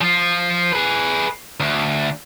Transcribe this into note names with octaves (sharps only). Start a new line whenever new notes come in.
F3 F4
G#4 B4
D2